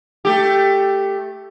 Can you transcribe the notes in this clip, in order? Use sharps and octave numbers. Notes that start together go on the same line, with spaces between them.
A3 G4